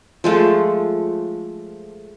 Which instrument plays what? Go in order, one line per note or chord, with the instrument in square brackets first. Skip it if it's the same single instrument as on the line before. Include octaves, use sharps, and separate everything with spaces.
[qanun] F3 G#3 A3